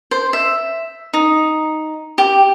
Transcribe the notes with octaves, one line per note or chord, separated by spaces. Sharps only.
C5
E5
D#4
G4